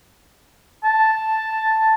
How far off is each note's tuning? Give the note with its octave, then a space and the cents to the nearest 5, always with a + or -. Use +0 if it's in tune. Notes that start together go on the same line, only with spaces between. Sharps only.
A5 +0